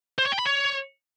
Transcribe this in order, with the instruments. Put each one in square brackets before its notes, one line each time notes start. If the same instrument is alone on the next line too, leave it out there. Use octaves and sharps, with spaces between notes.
[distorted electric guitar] C5
C#5
G5
B5
C#5